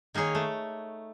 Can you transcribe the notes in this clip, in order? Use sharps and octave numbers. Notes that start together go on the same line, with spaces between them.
D#3 A#3 D#4 G#4 C#5
A3